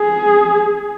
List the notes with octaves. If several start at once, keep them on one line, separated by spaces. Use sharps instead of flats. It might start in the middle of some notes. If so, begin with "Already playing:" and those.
Already playing: G#4